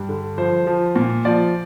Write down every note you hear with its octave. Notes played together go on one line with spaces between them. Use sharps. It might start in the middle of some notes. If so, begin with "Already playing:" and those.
Already playing: G2
D3
F3 C5
F3
A#2
F3 D5